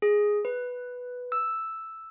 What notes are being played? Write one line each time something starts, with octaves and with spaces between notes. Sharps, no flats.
G#4
B4
E6